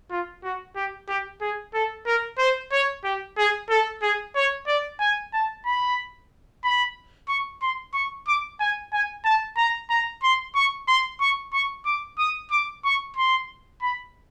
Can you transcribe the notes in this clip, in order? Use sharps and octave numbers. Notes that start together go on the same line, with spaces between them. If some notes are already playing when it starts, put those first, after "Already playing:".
F4
F#4
G4
G4
G#4
A4
A#4
C5
C#5
G4
G#4
A4
G#4
C#5
D5
G#5
A5
B5
B5
C#6
C6
C#6
D6
G#5
G#5
A5
A#5
A#5
C6
C#6
C6
C#6
C#6
D6
D#6
D6
C#6
C6
B5